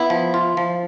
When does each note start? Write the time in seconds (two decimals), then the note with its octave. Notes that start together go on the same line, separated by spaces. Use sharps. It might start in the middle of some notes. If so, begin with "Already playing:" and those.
Already playing: B3 E4
0.10 F3
0.34 F4
0.57 F3